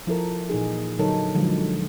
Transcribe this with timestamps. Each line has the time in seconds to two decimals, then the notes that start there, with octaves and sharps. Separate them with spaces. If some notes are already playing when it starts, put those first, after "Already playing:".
0.07 F3 E4 A4 A#4
0.49 A#2 E3 D#4 G#4
0.99 D3 F#3 D#4 A4 A#4 C#5
1.35 D3 F3 F#3 G#3